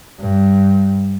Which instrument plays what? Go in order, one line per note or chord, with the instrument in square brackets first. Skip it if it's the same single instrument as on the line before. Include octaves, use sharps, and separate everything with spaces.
[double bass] G2